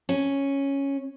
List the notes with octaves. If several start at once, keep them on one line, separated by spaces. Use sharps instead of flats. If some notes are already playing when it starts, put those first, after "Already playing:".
C#4